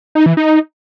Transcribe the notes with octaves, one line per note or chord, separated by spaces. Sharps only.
D#4
E3
D#4